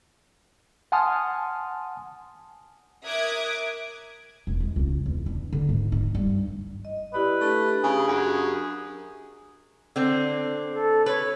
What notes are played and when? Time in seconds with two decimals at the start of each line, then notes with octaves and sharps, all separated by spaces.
0.92 F#5 G#5 A5 C6 D#6 F6
3.04 A#4 E5 D6 D#6 F#6 G#6
4.47 E1
4.60 G#3
4.76 C#2
5.06 E2
5.26 D4
5.53 D3
5.69 G#2
5.92 D#4
6.15 G2
6.85 D#5
7.14 E4 G4 B4 D5
7.41 A3 D4 G4
7.84 C#3 G#4
8.08 F#2
9.96 D3 C4
10.71 A4
11.06 B4 C#5